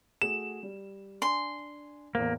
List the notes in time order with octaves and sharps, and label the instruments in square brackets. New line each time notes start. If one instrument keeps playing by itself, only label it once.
[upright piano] A3 F#4 G#4 [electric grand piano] E7
[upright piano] G3
[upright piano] D4 G#5 [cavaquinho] C6
[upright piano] E2 A2 C5 [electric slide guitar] A#3